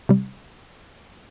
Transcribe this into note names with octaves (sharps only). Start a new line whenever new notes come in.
C3 G3